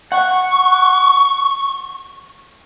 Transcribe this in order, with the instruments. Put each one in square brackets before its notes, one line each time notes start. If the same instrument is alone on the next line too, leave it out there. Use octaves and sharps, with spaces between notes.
[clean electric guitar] F#5 [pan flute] C#6